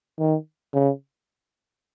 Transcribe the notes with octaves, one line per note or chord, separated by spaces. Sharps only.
D#3
C#3